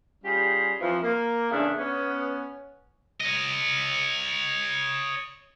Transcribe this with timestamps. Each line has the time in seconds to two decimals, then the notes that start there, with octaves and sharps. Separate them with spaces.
0.24 G3 C#4 F4 G4 G#4
0.80 F2 E3 F3
1.03 A#3
1.51 E2 C#3 A3 D4 E5
1.78 B3 C#4
3.20 C#5 D#5